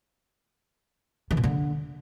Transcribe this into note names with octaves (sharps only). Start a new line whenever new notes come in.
E3
A#2
D3